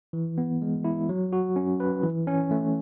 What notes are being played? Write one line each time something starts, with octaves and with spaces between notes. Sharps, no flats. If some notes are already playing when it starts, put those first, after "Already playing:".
E3
B3
G#3
E4
F#3
F#4
C#4
B4
E3
C#4
A3